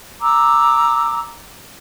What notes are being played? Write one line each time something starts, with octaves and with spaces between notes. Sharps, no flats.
A#5 D6 E6